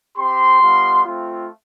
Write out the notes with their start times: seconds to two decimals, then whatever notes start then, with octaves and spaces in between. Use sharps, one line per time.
0.17 C4 G4 C6
0.61 G3 B3 F4
1.04 A3 C4 F4